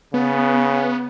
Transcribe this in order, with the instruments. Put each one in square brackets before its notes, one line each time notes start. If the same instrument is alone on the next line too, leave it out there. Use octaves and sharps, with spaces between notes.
[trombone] C#3 [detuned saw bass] B3